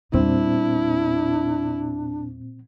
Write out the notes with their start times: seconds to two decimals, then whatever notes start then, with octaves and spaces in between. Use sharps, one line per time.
0.13 E2 A#2 G3 C4 D4 E4